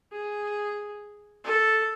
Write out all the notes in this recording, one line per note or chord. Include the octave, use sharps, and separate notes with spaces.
G#4
A4